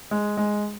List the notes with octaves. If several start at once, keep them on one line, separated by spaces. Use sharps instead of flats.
G#3
G#3